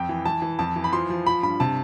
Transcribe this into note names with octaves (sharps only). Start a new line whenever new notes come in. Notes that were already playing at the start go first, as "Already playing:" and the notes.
Already playing: F2 G5
E3
E3 A5
E3
F2 A5
E3
B5
F3 C6
F3
F3 B5
G2 B5
C3 A5